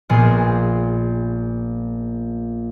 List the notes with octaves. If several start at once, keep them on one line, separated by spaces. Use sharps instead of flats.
A#1 A#2 B3 G#4 C5 C7